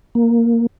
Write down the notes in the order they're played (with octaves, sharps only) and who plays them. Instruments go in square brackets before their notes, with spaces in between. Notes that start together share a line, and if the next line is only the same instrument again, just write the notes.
[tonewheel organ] A#3